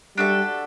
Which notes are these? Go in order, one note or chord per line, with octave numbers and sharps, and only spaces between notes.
G3 D4 F#4 A4 E5